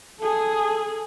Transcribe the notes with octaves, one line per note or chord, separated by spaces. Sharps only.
G#4 A4